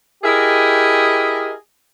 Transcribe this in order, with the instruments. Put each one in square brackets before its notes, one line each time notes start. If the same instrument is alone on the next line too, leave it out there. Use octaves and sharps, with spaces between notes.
[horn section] E4 G4 G#4 A#4 D#5